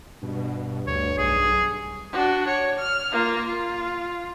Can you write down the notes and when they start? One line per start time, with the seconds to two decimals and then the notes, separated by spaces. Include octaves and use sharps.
0.23 G2 B2
0.87 D2 C#5
1.18 B1 G#4
2.13 D4 F#4
2.48 C#5
2.79 F6
3.12 A#3 F4
3.45 F4